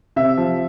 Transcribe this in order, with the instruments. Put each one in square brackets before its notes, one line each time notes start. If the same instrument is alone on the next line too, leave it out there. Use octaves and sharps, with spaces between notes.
[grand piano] C3 E5
F3